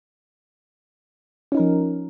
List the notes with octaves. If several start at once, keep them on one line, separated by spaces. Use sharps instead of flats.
F3 C#4 D#4 A#4